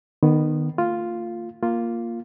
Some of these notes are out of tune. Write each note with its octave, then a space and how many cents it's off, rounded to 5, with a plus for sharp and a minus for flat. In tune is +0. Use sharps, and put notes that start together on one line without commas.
D#3 -25 B3 +0
A3 +45 F4 +0
A#3 +0 F4 +0